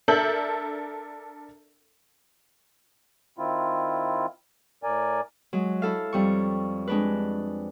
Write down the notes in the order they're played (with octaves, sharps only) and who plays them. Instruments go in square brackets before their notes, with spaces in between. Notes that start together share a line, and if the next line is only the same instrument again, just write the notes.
[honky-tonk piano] D4 A4 A#4 E5 G6 F#7
[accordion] D#3 C4 E4 F4
A2 A#4 D5 G#5
[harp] F#3 G#3
E4 A4 F5
F2 G3 C#6
G#3 D4 B4